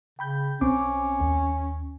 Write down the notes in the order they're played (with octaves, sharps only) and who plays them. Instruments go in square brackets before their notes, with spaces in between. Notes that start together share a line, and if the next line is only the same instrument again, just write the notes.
[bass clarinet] C#3 [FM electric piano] G5 B5 G6
[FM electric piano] B1 C4 D6 [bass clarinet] C#4
[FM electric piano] D#2